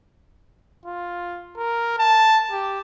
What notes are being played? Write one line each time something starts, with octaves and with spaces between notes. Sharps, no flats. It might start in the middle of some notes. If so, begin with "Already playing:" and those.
F4
A#4
A5
G4